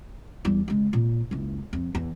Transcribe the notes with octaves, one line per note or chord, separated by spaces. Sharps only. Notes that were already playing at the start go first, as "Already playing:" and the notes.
E2 G3
C#3 G#3
A#2
F#1 C#2
F2
E2